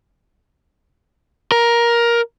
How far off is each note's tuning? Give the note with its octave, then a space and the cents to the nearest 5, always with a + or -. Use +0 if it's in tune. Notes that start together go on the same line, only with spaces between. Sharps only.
A#4 +15